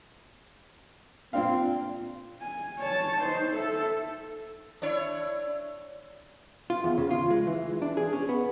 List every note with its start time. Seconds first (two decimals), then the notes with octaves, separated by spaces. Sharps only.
1.33 A#2 C4 D4 F5
2.41 G#5
2.79 C#5 A5
3.20 D#4 C5
3.52 A4 E5
4.82 D4 E4 C#5
6.70 F4
6.84 E2
6.98 C#3
7.11 F4
7.30 G#3
7.47 E3
7.82 D4
7.97 G#4
8.13 C#4
8.29 B3